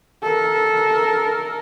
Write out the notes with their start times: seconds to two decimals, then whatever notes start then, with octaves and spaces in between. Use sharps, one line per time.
0.23 A4 A#4